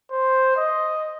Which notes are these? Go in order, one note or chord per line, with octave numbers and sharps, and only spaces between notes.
C5
D#5